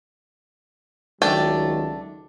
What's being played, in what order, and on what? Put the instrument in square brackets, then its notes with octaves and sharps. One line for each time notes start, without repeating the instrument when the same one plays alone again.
[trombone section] C#2 D#3 F#3 [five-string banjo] A3 D4 G5